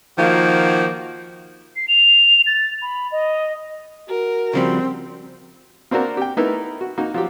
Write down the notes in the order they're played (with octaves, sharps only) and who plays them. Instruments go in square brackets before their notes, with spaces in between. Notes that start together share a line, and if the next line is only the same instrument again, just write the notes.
[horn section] D#3 F3 A#3 F#4
[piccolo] C7
F7
A6
B5
D#5
[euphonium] F#4 [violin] A#4
[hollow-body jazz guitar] C#3 F3 G3 [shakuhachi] C4
[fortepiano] A#3 C4 D4 F#4 A#4
G4 G5
A3 B3 D#4 E4 A#4
F#4
A#3 D#4 F#4
F3 F#3 G4